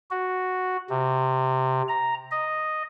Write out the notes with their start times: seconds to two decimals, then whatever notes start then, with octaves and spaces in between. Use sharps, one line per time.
0.11 F#4
0.90 C3
1.89 A#5
2.31 D#5